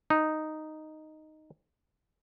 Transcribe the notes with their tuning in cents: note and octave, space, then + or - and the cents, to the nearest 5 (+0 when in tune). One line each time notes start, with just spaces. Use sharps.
D#4 -5